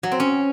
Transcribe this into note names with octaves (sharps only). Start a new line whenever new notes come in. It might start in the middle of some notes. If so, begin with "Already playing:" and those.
F#3
C4
C#4